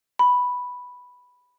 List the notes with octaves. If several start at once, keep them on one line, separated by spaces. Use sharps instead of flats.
B5